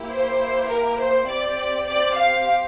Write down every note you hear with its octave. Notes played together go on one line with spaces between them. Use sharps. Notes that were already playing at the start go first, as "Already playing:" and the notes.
Already playing: A#3 E4 G4
C5
A#4
C5
C4 G4 D5
D5
F5